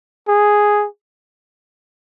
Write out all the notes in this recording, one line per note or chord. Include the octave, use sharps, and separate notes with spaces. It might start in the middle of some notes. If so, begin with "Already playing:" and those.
G#4